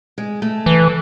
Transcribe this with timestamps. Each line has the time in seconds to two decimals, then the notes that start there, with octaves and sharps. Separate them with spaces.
0.18 G#3
0.42 A3
0.66 E3